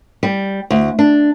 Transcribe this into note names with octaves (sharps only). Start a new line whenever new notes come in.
G3
D2
D4